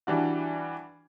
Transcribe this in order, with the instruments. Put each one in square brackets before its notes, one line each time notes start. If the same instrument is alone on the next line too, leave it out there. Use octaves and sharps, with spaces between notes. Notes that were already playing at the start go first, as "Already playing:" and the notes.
[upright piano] E3 G3 D4 F#4